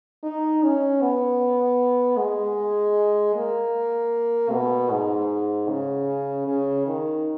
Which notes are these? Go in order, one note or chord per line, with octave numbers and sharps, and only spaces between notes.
D#4
C#4
B3
G#3
A#3
B2
G#2
C#3
C#3
D#3